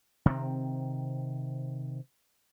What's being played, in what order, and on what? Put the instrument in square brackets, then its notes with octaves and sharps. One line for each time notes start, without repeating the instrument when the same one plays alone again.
[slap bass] C3 D#3 C4